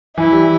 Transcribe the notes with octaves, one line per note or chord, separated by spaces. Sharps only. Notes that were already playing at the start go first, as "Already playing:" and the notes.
E3 E4
G3